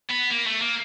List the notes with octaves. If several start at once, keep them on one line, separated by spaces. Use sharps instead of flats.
B3
A#3
A3
A#3